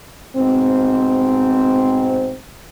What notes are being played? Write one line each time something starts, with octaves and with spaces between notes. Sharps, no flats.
G#2 B2 C4